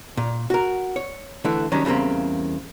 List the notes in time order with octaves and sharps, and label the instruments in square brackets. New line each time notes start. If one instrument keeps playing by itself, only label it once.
[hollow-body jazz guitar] A#2
F#4 A#4
C#5
D3 E3 A3
D#3 F#3 G3 C#4 D4
E2 C#3 G3 A#3 C4